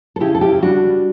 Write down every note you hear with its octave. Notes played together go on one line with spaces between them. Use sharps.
A4
C#3 E4 G4
A4
C#3 E4 G4
E4
G3 D4 F#4
G3